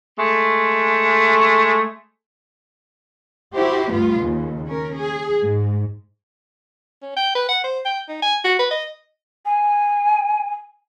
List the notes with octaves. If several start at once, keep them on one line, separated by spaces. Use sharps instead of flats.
G#3 A3
E4 F#4 G4 C5
D2 G2 B3 F4
D#2 C#3
C#4 A#4
G#4
G#2
C#4
G5
B4
F#5
C5
G5
D#4
G#5
F#4
B4
D#5
G#5